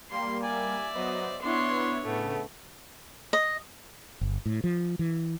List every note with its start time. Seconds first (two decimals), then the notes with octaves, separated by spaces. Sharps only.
0.11 G3 A#3 C6
0.44 D5 E5 G#5
0.93 F#3 B3 C5 D#5
1.42 B3 D4 E4 C#5 C6
2.05 A2 C#3 A3 B3
3.33 D#5
4.21 G1
4.46 A2
4.64 F3
4.99 E3